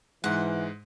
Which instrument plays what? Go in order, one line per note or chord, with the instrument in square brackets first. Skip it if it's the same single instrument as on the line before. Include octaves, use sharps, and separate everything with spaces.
[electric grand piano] G#2 G#3 [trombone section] E3 [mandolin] F#5